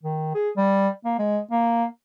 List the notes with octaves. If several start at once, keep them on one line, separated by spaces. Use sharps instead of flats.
D#3
G#4
G3
A#3
G#3
A#3